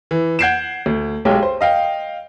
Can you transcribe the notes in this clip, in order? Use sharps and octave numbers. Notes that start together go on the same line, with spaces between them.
E3
F#5 G6 G#6 C7 D7 E7
D2
B1 G#3 G4 C#5 G5
C5
D#5 F5 G5